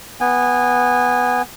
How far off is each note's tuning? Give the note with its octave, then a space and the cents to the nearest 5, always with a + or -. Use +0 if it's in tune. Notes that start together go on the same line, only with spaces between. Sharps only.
B3 +0 G#5 -20